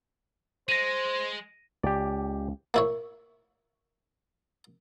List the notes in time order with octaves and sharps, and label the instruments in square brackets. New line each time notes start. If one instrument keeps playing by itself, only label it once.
[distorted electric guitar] G#3 [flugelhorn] C5 [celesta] A#6 D#7
[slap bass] C#2 [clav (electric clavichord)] G4 D5
[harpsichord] A#3 E4 C#5